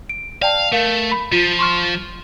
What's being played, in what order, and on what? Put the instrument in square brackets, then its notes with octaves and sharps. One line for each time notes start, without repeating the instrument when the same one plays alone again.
[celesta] D7
[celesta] D5 G5 A5 [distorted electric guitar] F5
[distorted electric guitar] A3 [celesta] A#4 F5
[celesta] B5 B6
[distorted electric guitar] F3 [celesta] F4
[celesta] C6 C#6 F6